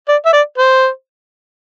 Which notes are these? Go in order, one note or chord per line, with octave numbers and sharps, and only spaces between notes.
D5
E5
D5
C5